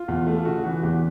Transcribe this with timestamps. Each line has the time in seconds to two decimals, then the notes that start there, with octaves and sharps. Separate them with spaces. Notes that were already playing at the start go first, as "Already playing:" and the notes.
Already playing: F4
0.08 E2
0.27 A3
0.36 F4
0.45 C#3 F#4
0.64 E3 F#4
0.83 E2 G4